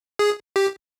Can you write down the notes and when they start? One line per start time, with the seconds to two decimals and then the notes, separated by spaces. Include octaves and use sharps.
0.19 G#4
0.56 G4